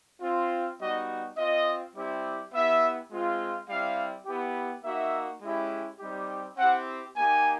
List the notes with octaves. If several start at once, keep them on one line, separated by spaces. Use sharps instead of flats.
C4 F4
G3 B3 D#4 F#4 D#5
C4 F4 D#5
G3 C4 E4 G4
B3 E4 G4 E5
G#3 C4 F4
G3 C4 E4 G4 F5
B3 E4 G4
A#3 D#4 F#4 E5
G#3 C#4 E4 G4
G3 C4 D#4 G4
C4 E4 G4 F#5
A#3 D#4 G4 G#5